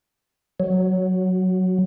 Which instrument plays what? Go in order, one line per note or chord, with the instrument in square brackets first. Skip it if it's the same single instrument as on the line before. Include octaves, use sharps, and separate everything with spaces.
[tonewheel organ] F#3